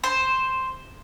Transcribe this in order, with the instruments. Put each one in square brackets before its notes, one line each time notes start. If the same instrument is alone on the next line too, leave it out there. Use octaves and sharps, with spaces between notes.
[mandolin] C5